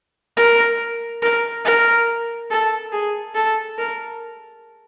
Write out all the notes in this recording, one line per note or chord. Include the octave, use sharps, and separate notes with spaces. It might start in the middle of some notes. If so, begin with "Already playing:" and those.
A#4
A#4
A#4
A4
G#4
A4
A#4